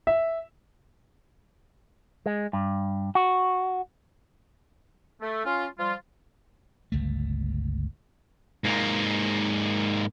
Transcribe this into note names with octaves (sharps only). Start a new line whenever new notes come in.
E5
G#3
G2
F#4
A3
C#4 F4
F3 G3 F4
G1 C#2 A3
G#2 A#3